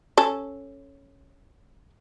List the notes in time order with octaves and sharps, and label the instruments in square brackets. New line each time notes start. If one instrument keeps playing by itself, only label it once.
[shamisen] C#4 A4